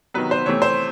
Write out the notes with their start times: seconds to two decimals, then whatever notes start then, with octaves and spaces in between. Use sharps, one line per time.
0.14 C3 D#3 F#3 B3 B4
0.31 C5
0.46 C3 E3 A3 C4 C#5
0.62 C5